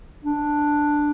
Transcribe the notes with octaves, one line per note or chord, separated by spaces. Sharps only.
D4